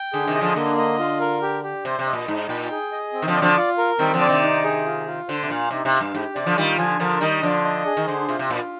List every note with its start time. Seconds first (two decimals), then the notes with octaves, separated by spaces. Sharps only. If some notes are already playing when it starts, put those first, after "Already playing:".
Already playing: G5
0.13 D3 G#4
0.27 C3 D#3
0.35 D#5
0.41 D3 F3
0.56 D3 A#3
0.78 D#5
0.99 F4
1.20 A#4
1.42 G4
1.63 G4
1.85 C3 C5
1.99 C3
2.07 D#5
2.13 A#2
2.28 G#2 D#4
2.49 A#2 G5
2.71 G#4
2.92 D#5
3.13 C4
3.22 D#3
3.28 D3 F3
3.35 D5
3.42 D3 F3
3.56 F4
3.78 A#4
3.99 D#3 G3 C4
4.14 D3 F3
4.21 D5
4.29 C3 D#3
4.43 D#4
4.64 G#4
4.86 F4
5.07 F4
5.28 D3 C5
5.43 C3
5.50 A#2 F5
5.71 C3 D#4
5.85 C3
5.93 F5
6.00 G2
6.14 G#2 G4
6.35 C3 D5
6.46 D3 F3
6.57 D#3 G3 F4
6.78 D3 F3 G#5
6.99 D3 F3 A#4
7.21 D#3 G3 D#5
7.43 D3 F3 D4
7.64 D#5
7.86 G#4
7.97 D#3
8.07 D3 C5
8.29 C3 F4
8.39 C3
8.50 A#2 F4